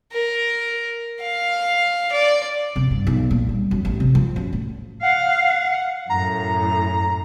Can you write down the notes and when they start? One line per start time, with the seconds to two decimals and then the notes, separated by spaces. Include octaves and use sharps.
0.12 A#4
1.21 F5
2.12 D5
2.76 C3
2.91 G2
3.07 B1
3.31 A#2
3.49 G3
3.71 F#2
3.85 A1
4.00 C3
4.15 F3
4.36 F#2
4.53 A2
5.03 F5 F#5
6.10 F#2 A2 A#5